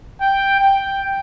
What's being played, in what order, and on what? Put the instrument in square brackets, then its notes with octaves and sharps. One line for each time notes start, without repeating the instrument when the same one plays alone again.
[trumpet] G5
G5